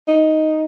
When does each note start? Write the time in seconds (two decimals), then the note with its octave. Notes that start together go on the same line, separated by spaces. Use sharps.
0.08 D#4